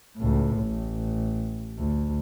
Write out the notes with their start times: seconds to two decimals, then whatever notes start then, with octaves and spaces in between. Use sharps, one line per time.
0.17 C#2 A2
0.60 A1
1.79 D2